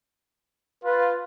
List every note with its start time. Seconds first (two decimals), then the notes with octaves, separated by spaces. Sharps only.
0.84 F4 B4